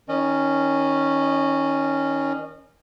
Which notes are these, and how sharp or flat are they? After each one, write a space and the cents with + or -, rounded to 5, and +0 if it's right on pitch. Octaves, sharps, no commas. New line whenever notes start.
D#3 +20 C#4 +0 D#5 -35